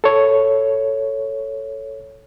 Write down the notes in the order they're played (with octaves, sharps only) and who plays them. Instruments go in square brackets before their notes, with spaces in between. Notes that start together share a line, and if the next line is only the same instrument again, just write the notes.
[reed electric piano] A4 C#5